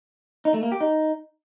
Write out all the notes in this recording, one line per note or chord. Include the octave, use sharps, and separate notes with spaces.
D#4
A3
A#3
G4
D#4